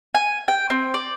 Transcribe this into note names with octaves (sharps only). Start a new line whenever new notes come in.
G#5
G5
C4
D5